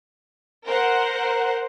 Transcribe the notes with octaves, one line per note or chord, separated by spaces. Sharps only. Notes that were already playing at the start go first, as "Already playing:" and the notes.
A#4 C5 F#5